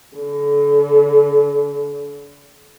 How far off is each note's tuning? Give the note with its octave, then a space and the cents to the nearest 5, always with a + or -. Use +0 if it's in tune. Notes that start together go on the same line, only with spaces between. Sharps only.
D3 -40